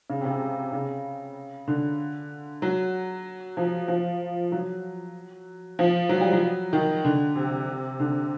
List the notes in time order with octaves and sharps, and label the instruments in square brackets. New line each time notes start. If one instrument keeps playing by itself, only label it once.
[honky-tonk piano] C#3
C3
C#3
C#3
D3
F#3
F3
F3
F#3
F3
F#3
G3
F#3
D#3
D3
C3
D3